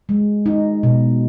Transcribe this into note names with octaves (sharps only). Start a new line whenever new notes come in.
G#3
D#4
B2